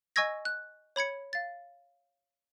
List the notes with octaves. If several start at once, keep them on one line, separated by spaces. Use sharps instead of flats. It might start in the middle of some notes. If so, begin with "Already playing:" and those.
D#5 G#5 C#6 E6 G#6 A#6
F#6
C#5 B5 G#6 C#7
F5 A6